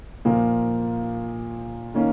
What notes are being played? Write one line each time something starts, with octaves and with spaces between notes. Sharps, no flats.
A#2 F3 A#3
D#3 A#3 C#4